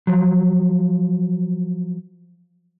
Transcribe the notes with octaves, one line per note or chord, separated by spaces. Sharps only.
F3 F#3